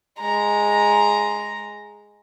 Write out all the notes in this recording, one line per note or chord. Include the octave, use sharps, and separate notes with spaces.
G#3 A#5